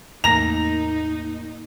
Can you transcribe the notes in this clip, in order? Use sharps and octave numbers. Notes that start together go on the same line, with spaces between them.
E2 A2 A#3 D#4 A#5 A#6 F7